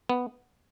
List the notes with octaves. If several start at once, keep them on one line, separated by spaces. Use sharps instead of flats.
B3